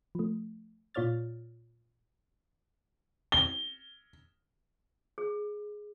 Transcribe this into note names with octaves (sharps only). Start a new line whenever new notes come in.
F3 A3
A#2 F4 C#5 D5 F6 A6
G7
G#4